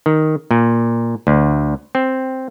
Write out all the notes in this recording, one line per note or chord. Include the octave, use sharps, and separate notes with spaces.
D#3
A#2
D2
C4